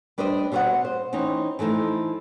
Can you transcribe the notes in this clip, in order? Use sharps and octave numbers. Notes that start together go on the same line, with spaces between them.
G3 D4 B4 C5 D#5
B2 G3 C4 C#5 D#5 F#5
C5
E3 C4 C#4 D#4
E3 F3 A3 D#4 E4